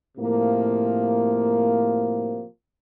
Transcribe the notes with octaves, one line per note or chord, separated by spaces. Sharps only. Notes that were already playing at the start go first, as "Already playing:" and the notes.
A2 C3 F3 A#3